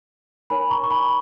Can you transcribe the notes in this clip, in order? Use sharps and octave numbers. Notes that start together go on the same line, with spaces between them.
D#4 A#4 C#5 G#5 B5
A#5 C#6
C#6
G#5 B5